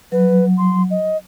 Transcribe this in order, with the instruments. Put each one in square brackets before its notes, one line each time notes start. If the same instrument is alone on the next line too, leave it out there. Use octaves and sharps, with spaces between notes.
[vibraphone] F#3 [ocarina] B4
[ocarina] C6
D#5